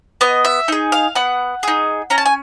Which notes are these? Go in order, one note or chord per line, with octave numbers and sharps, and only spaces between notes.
B3 D#5
E5
D#4 G#4
F5
B3 F#5
D#4 G#4
C#4 A#5
A5
G#5